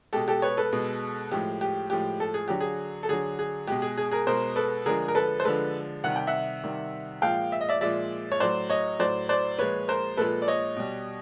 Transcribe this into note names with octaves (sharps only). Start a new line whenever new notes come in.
B2 G#3 G4 A4
G4 A4
B4 C#5
A4 B4
B2 G#3
A2 F3 G#3 G4
G4
A2 F3 G#3 G4
A4
G#4
D3 F#3 G4
G#4
A4
D3 F#3 G#4
G#4
B2 G#3 G4
G#4
G#4
G#4 A#4
B2 G#3 A#4 C5
A4 B4
D3 F3 G#3 G#4 A#4
A#4
A4 B4
C5
D3 F3 G#3 A4 B4
C3 D#3 G3 F#5
G5
E5 F#5
C3 D#3 G3
A#2 F3 G#3 F5 G5
E5
D#5
D5 E5
A#2 F3 G#3 D5 E5
C#5
A2 F#3 C5 D5
C#5 D#5
A2 F#3 C5 D5
C5 D5
A#2 F3 G#3 B4 C#5
A#4 C5
A#2 F3 G#3 A4 B4
D5
C#5 D#5
B2 G3